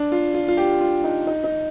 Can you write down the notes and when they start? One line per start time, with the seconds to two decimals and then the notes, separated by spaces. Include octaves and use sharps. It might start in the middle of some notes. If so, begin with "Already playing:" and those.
Already playing: D4
0.12 F4
0.34 F4
0.48 F4
0.57 G4
0.81 F4
1.04 D#4
1.27 D#4
1.44 D#4